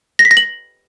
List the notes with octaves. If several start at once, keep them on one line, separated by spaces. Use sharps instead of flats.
A#6
B6
A#6
F#7